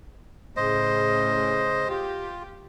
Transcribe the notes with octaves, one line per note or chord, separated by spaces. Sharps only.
A2 C#3 C5 D#5
F4 G4